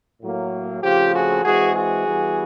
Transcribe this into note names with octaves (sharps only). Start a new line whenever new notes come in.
A2 F#3 A#3
C#3 F3 A3 C4 F4 G4
F#4 G#4
E3 G#3 C4 F#4 G#4
F#4 G#4
E3 G3 B3